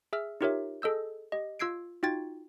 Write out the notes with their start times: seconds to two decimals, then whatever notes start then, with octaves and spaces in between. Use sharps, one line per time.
0.13 G#4 E5 E6 F6
0.41 D#4 F4 G4 A#4 C#5 E5
0.82 G#4 A4 D#5 E6 G6
1.32 G4 D#5
1.59 F4 E6 G#6 C7 D7
2.03 D#4 F4 F#4 G5 G#6 A6